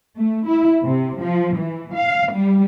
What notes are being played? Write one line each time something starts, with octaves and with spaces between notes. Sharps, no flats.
A3
E4
C3
F3
E3
F5
G3